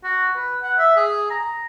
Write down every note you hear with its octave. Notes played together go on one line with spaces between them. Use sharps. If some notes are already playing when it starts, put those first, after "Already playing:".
F#4
B4
F#5
E5
G#4
A#5